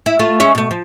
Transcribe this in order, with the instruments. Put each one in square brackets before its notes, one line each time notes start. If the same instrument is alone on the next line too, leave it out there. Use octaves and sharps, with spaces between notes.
[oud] E4
A3 F4
G#3 C#4 E5
B2 A3
F3